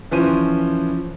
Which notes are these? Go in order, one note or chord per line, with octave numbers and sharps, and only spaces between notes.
E3 F3 C#4 C5 D#7